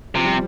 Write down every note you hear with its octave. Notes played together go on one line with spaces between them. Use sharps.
C3 F3
G3